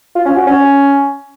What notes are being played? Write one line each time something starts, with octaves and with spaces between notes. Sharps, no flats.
F4
C#4
F#4
C#4